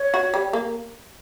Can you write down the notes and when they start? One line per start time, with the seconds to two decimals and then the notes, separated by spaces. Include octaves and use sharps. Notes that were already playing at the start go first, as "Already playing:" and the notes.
Already playing: C#5
0.14 F#4
0.34 G3
0.53 A#3